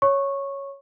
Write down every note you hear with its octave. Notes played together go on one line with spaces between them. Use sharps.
C#5 C#6